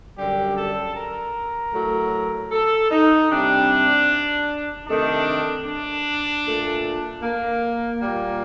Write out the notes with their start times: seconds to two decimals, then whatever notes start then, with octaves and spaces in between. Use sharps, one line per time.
0.16 F#2 D3 G3 G4
0.55 A4
0.94 A#4
1.73 A2 F#3 A3
2.51 A4
2.91 D#4
3.29 C3 G3 D4
4.86 C3 D#3 A3 D4
5.65 D4
6.43 A#2 A3
7.21 A#3
7.99 A#2 G3 A#3